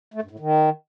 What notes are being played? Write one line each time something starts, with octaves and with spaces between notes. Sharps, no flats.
A3
G2
A2
D#3